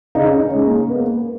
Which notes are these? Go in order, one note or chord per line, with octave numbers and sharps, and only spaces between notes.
C#3 D#4
C#4
G#3
A#3
A#3 B3